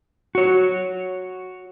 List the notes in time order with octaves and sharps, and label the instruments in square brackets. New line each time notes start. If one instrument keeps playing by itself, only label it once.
[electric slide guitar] F#4 C#5